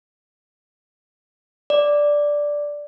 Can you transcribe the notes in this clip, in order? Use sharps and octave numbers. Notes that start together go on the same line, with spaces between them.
D5